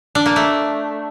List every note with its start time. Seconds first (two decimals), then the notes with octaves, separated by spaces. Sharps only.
0.15 D4
0.26 A#3
0.36 A3